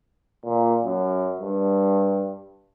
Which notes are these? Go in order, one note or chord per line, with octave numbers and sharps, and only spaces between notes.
A#2
F#2
G2